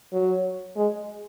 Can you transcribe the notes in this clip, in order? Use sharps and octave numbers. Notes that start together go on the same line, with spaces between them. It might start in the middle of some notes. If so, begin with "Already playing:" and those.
F#3
G#3